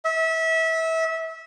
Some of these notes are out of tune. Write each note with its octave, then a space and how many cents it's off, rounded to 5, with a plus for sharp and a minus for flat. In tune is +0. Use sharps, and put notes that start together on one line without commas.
E5 -25